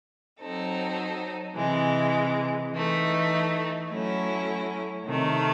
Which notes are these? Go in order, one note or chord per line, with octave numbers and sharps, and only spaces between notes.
F#3 C4 D#4 A4
C3 E3 G#3
E3 A3 D#4
F#3 A3 C#4 E4
C3 D#3 A3